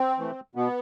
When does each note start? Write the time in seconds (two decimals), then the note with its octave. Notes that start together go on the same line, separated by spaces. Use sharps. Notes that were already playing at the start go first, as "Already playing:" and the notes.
Already playing: C4
0.19 E3 A3
0.55 B2 B3